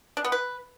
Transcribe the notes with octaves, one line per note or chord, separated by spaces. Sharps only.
D4
B3
B4